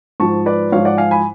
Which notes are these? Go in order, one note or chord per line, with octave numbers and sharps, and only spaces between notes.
G#2 F3 A5 C#6
B4 D5
G#2 F3 C#5 F5
D5 F#5
F5 G#5
G#5 B5